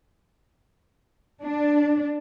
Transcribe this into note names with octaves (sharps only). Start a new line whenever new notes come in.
D4